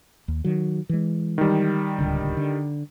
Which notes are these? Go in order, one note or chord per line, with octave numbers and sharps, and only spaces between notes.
D#2
D#3 F#3
E3 G#3
D#3 G3
D1 C#2 D3
D3